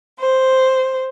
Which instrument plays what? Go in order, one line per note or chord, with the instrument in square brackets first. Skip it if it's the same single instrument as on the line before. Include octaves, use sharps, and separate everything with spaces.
[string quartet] C5